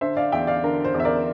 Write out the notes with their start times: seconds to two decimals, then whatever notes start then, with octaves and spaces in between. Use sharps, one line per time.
0.01 D3 C5 E5
0.17 D5 F5
0.32 E2 E5 G5
0.47 D5 F5
0.63 D3 A#4
0.84 C5
0.94 E2
1.00 E5
1.05 A#4 D5